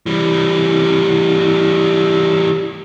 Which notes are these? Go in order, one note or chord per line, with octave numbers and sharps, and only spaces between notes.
E3 G3